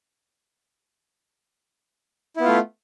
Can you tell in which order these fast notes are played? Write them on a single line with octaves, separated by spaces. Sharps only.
E4 B3 F4 A3